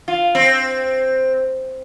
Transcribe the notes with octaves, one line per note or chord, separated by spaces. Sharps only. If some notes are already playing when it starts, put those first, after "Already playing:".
F4
C4